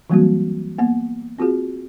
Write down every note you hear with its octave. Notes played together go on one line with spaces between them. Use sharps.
E3 F#3 G3 A#3 C4 F#4
A#3 B3 F#5
C4 F4 F#4 G#4